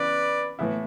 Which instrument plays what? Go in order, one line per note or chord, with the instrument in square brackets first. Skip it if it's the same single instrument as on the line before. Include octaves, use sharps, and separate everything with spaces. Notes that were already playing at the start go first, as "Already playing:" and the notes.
Already playing: [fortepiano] C#3 E3 B3 [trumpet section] B4 D5
[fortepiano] A2 E3 B3 E4